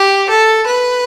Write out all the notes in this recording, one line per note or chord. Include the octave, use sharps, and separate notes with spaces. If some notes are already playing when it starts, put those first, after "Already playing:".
Already playing: G4
A4
B4